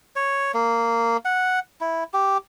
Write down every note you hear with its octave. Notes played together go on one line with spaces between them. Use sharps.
C#5
A#3
F#5
E4
G4